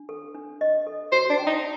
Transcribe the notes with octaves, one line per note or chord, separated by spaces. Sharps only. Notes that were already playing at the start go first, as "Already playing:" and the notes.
Already playing: D4
A4
D4
D#5
A4
F#4 C5
D4
G5
D#4